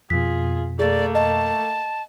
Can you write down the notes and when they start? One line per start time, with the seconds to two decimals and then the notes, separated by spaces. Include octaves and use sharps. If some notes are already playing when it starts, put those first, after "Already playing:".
0.10 F2 B2 F4 G#4 B6
0.79 A3 A#3 G#4 D5
1.15 D#5 A5